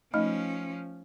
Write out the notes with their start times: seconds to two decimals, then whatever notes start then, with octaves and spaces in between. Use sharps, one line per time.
0.14 F3 A3 C#4 D#4 D#5